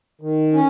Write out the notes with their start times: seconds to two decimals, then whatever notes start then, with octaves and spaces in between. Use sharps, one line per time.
0.21 D#3
0.53 C#4